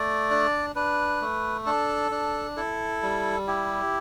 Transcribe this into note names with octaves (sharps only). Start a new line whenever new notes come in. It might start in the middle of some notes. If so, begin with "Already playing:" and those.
Already playing: A3 D5
D4
D4 B4
A3
D4 A4
D4
E4 A4
G3
E4 G4